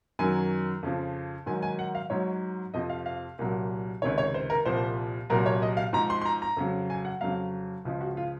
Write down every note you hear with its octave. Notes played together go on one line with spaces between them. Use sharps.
F#2 D#3 F#3 G#5
F2 C#3 F3
G#2 D#3 F#3 G#5
G#5
F#5
F5
G#2 F#3 C#5
F2 C3 F3 D#5
F5
F5
C2 A#2 F#3
C#2 C3 D#3 C#5
C#5
C5
A#4
C2 A#2 F3 C5
C2 A#2 F#3 A#4
C#5
D#5
F5
G#2 F3 A#5
C6
C6
A#5
A#5
F2 C#3 F#3
G#5
F#5
F2 C#3 F#3 F5
C#2 C#3 F3
F#4
F4